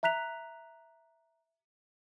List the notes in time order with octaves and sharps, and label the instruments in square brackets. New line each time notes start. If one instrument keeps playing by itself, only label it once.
[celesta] E5 A#5 F#6 B6 F7